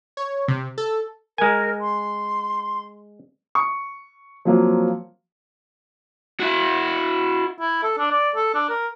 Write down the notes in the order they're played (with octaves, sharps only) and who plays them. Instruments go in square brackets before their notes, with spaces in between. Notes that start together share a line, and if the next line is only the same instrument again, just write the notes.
[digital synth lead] C#5
C3
A4
[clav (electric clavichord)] G#3 G#5 [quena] A#4
[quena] C6
[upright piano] C#6
F3 F#3 A#3 C4
[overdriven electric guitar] E4 F#4
[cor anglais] E4
A4
D4
D5
A4
D4
A#4